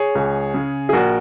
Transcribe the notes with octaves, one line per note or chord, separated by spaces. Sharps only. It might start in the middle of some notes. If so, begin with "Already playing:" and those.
Already playing: G#4 C#5
C#2
C#3
G#4
A#1 F#4 A#4